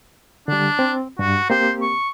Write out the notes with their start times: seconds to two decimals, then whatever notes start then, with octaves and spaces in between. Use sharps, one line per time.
0.48 D3 G3 D4
0.79 C4
1.19 G2 F#4
1.50 A#3 C4 G4 C5
1.81 C#6